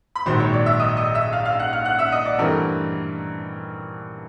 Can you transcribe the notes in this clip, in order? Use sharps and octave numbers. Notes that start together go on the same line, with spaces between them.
B5
A#1 G#2 D#3 F#3 C5 C6
C#5 C#6
D5 D6
E5 E6
D#5 D#6
D#5 D#6
E5 E6
F5 F6
F5 F6
F#5 F#6
F5 F6
F#5 F#6
E5 E6
D#5 D#6
D5 D6
G2 E3 A3 C4 A#4 A#5